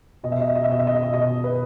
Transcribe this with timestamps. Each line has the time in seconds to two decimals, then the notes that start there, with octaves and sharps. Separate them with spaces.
0.23 B2 D#5
0.32 E5
0.41 D#5
0.47 E5
0.55 D#5
0.64 E5
0.69 B2 D#5
0.79 E5
0.87 D#5
0.95 E5
1.03 D#5
1.13 B2 D#5
1.44 B4